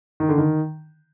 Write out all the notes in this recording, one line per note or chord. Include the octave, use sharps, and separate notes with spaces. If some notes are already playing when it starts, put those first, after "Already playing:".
D#3
D3
D#3